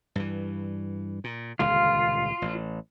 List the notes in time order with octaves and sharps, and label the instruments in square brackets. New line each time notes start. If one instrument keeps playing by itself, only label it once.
[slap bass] G2 E3
A#2
[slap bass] D#1 C#2 D3 [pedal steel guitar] F4
[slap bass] A1